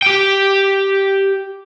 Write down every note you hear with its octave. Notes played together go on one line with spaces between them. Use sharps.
G4 G5